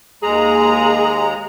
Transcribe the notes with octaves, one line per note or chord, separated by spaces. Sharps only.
D#2 G#3 G#4 A#5